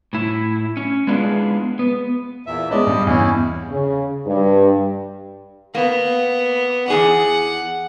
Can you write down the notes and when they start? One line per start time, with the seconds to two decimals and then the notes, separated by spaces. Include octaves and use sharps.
0.13 A2 E4
0.77 C#4
1.07 G#3 B3 D4 E4 F4 G#4
1.79 B3
2.46 E2 A#2 E5
2.71 G#3 B3 C#4 D5 D#5
2.87 G2
3.07 E2 C#4 E4
3.70 C#3
4.26 G2
5.75 A#3 B3
6.88 E2 G#4 D5 F#5